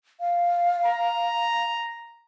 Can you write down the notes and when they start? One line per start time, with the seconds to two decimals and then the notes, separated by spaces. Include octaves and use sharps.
0.20 F5
0.86 A#5